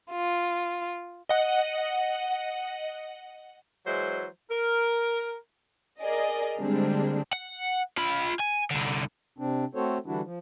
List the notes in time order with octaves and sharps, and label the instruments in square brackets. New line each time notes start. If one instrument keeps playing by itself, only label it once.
[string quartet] F4
[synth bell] D#5 F#5
[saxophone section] E3 F#3 G#3 C5 E5
A#4
[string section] G#4 A#4 D5 D#5
D3 G3 G#3 A#3 C4 D4
[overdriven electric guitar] F#5
F4 B5
G#5
C2 D3
[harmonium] C3 C4 D4
A3 C4 F#4 A4 C5 C#5
D3 E3 G3 D4 E4 F#4
F3